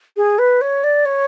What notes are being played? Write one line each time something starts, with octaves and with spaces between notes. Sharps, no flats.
G#4
B4
C#5
D5
C#5